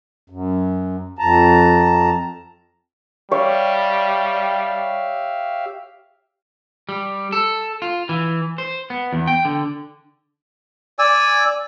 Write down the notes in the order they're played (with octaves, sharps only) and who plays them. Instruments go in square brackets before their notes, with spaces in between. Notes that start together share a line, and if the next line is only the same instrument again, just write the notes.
[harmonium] F#2
F2 A5 A#5
[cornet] G3 [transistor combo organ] G4 E5 F5 [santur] C#5
[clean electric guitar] G3
A4
F4
E3
C5
B3
E2
G5
D3
[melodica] D5 G#5 E6